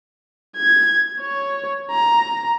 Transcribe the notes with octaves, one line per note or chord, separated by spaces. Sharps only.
G#6
C#5
A#5